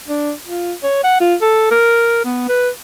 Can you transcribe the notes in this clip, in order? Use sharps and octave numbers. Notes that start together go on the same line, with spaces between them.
D4
F4
C#5
F#5
F4
A4
A#4
B3
B4